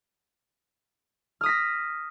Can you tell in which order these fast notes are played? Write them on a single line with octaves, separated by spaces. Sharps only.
F6 D#6 B6 A#6